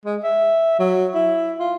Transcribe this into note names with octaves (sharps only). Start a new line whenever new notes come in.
G#3
E5
F#3
E4
F4